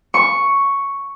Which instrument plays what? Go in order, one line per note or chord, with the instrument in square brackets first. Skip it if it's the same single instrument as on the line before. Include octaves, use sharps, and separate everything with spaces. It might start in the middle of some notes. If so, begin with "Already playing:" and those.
[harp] C#6